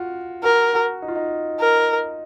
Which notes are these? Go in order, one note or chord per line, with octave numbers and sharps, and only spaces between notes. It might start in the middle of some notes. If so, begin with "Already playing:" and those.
Already playing: F4 F#4
F#4 A#4
F#4
D#4
F4
D#4
A#4